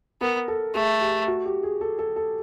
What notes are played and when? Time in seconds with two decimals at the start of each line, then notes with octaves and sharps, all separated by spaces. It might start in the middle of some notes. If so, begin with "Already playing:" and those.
0.21 B3 A#4
0.48 A4
0.74 A3 G#4
1.01 G4
1.28 F#4
1.45 G4
1.63 G#4
1.81 A4
1.99 A4
2.16 A4